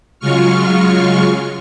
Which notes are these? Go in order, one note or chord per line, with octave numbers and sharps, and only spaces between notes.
C#3 F#3 G#3 F4 C#6 F6